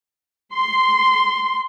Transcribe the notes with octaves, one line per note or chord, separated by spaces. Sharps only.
C6